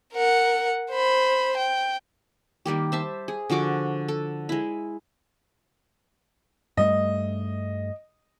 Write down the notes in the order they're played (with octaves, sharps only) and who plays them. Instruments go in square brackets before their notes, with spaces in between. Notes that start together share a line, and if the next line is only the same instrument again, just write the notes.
[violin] A#4 F#5
C5 B5
G5
[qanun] D#3 G3 A#3 G4
C5 E5 A5
G#4
D3 F3 F#4 D6
A4
G#3 E4
[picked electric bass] G2 G3 A3 [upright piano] D#5